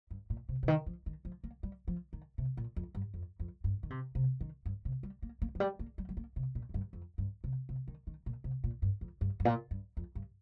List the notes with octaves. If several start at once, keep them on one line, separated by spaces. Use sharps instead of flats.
G2
A#2
C3
C3
D#3
F3
D#3
F3
A#3
G3
F3
D#3
C3
A#2
F2
G2
F2
F2
G2
D#3
C3
C3
D#3
G2
C3
G3
A#3
A#3
F3
G3
A#3
G3
G3
A#3
C3
A#2
F2
G2
F2
G2
C3
C3
D#3
D#3
A#2
C3
A#2
G2
F2
G2
G2
A#2
G2
F2
G2